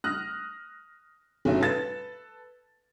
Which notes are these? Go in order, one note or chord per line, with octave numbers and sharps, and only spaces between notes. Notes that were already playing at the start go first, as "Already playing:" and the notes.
D#6 F6 F#6 A#6
G1 B2 D#3 C#4 E5
A4 B4 A6 E7